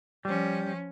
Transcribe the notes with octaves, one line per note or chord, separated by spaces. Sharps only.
F3 G3 C#4